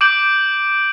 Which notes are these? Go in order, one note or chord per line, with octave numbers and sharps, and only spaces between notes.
D6 G6 D7 F#7